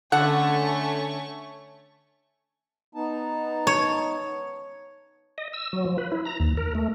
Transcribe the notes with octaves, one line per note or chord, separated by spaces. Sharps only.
D3 A3 C#4 A4 F#5 C#6
B3 D#4 A5
C#5
D#5
E6
F#3
F3
B4
E4
A#5
D#2
A#4
A3